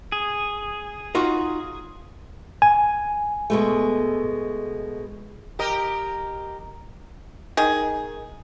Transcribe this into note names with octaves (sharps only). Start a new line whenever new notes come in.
G#4
D#4 F4 F#4
G#5
B2 G#3 A3
G4 A#4 D#5
D#3 G#4